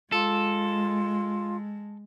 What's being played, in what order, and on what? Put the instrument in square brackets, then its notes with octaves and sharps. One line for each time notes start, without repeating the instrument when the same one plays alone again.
[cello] G#3 [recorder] F4 [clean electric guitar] A4